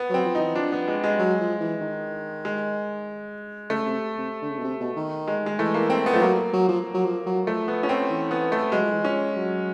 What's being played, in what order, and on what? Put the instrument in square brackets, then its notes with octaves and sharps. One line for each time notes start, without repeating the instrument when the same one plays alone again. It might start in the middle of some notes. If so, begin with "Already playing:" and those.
Already playing: [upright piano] B3
[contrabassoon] F#3 [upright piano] C4
[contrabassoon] F3
[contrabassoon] E3 [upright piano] D#4
[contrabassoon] F3 [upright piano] D4
[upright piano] B3
G#3
G#3
[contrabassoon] F#3
F3
E3
D#3
[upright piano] G#3
[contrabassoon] C#3 [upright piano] A3
[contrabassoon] C3
C3
D3
C#3
B2
C3
B2
D#3
[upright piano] G#3
G#3
[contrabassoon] E3 [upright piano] A3
[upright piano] A#3
C4
B3
[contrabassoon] F3 [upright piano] A3
[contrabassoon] F#3 [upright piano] A#3
[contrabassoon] F#3
F3
F#3
F3
F#3
[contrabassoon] F3 [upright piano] A3
[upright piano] B3
C#4
C4
[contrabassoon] E3
[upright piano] B3
A3
[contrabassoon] F#3 [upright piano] G#3
[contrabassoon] F3
E3
[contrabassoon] F3 [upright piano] C#4
[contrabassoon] F#3